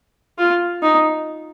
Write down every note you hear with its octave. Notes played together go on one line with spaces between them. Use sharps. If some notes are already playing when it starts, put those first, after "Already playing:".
F4
D#4